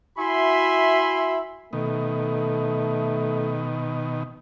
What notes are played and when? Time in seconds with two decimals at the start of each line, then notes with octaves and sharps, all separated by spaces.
0.18 E4 F#4 E5 G#5 B5 C6
1.73 B2 D#3 A3